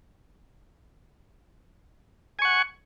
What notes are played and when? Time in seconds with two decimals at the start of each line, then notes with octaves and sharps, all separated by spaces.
2.39 G#5
2.42 C#6
2.45 F#5